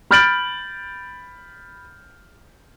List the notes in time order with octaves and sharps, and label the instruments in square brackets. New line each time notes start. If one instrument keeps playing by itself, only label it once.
[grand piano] B5 F6 G6 A6 D7 F#7